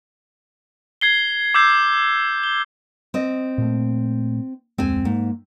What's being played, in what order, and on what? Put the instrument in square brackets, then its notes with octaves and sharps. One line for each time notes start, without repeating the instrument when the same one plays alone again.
[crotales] G#6 C7 G7
D6 E6 G6 C7
G7
[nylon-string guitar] C4 D#5
[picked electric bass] A#2 A3
[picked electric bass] D1 F2 G#3 [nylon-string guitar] C4 G#5
[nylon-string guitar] G#2 [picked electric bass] A#3